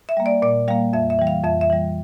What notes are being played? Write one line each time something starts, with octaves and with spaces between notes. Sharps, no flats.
E5
G3 A#3
D5
A#2 D5
G3 A#3 F5
F2 E5
E5
E3 G3
F5
F2 E5
E5
E3 G3